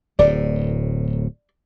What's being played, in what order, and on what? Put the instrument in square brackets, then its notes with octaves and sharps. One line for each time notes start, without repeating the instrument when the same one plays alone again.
[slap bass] D1 A2 [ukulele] D5